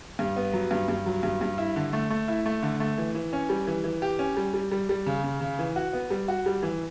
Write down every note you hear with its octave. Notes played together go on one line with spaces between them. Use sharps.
G2
B3
F#3
G2
G2
F#3
G2
G2
E4
D3
A3
A3
E4
A3
D3
A3
E3
E3
C#4
G3
E3
E3
G4
C#4
G3
G3
G3
G3
C#3
C#3
C#3
E3
F#4
B3
G3
F#4
G3
E3